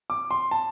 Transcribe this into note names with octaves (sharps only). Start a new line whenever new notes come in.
D6
C6
A5